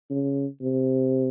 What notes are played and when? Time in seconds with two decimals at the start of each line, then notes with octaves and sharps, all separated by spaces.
0.10 C#3
0.61 C3